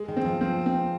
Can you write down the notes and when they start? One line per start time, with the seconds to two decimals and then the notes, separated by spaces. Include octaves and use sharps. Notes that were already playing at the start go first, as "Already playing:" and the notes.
Already playing: G#3
0.08 D#3
0.17 C4
0.25 F3
0.41 F3 C4
0.66 C4